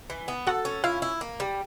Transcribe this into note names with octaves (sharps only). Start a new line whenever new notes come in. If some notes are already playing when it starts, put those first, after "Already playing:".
E3
B3
F#4 A4 F#5
C#4
E4 F4 F5
E4
A#3
G3